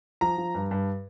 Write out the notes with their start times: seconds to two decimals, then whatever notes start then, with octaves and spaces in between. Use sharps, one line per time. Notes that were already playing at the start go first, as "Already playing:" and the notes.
0.21 F3 A#5
0.38 F3
0.55 G2
0.71 G2